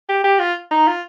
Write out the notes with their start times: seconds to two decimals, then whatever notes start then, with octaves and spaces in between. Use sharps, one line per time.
0.09 G4
0.24 G4
0.39 F4
0.71 D#4
0.87 F4